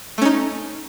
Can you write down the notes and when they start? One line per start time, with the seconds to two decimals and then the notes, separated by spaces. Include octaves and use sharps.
0.18 A3
0.22 C#4
0.25 D#4